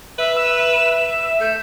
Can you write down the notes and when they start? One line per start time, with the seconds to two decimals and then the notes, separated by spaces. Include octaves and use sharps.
0.18 B4 E5
0.36 E5 E7
1.40 A3 G6